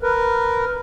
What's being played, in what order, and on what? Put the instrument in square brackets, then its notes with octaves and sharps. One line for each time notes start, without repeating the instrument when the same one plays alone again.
[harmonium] A#4 B4